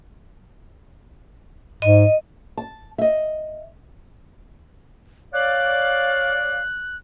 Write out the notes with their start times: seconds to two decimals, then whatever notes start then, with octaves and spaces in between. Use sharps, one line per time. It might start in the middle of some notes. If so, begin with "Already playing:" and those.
1.82 G#2 D#5
2.57 A5
2.98 D#5 E5
5.34 C#5 D5 F5 F#6